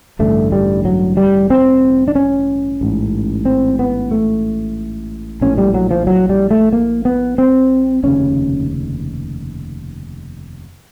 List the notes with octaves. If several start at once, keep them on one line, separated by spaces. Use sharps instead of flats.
A1 G2 D3 A3
G3
F#3
G3
C4
D4
C#4
A1 G#2
C4
B3
A3
A#1 A2 C#4
G3
F#3
F3
F#3
G3
A3
A#3
B3
C4
F1 D#2 C#3 C#4